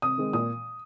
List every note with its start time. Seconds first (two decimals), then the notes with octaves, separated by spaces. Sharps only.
0.02 C3 D#6
0.18 D#3 G#3 C4
0.33 A#2 D#6